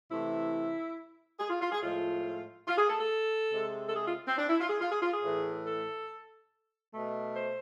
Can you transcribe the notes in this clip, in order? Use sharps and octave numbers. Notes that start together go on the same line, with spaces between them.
C3 E3 A3 E4
G#4
F4
F4
G#4
A2 F3 G#3 F4
F4
G#4
A4
A4
C3 G#3
A4
G#4
F4
C4
D4
E4
F4
G#4
F4
G#4
F4
G#4
A2 E3 A3
A4
B2 A3
C5